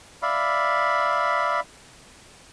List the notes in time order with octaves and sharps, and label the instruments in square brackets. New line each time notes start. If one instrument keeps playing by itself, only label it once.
[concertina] D5 E5 F5 B5